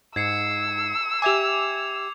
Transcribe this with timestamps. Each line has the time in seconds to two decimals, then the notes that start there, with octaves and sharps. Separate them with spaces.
0.16 G#2 E6 G#6 C7 C#7
1.22 G4 E5 G#5 D6 G#6 F7